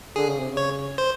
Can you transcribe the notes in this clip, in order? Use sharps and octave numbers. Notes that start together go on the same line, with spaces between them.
D3 G#4
C#3
C3
C#3
C#5
C5